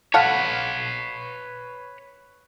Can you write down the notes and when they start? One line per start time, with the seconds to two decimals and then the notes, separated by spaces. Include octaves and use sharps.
0.14 A4 B4 C#5 F5 F#5